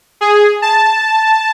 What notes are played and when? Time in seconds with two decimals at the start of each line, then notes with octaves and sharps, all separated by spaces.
0.21 G#4
0.62 A5